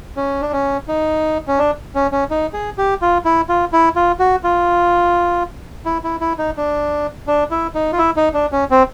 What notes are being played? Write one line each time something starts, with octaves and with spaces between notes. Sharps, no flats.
C#4
D4
C#4
D#4
C#4
D4
C#4
C#4
D#4
G#4
G4
F4
E4
F4
E4
F4
F#4
F4
E4
E4
E4
D#4
D4
D4
E4
D#4
F4
E4
D#4
D4
C#4
C4